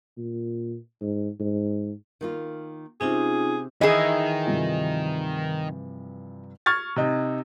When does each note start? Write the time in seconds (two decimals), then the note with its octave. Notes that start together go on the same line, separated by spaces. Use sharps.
0.17 A#2
1.01 G#2
1.40 G#2
2.21 D#3 A#3 F4
3.01 C3 C4 C#4 D#4 F4 G#4
3.81 D#3 E3 E4 G#4 D#5
4.46 G2 C3 F3
6.66 C#6 F6 G#6 A6
6.96 C3 D#4